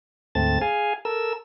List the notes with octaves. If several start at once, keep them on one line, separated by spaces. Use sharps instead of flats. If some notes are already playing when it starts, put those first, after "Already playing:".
D2 G#2 A3 C4 A5 A6
G#4 F5 G#5
A4 A#4 E6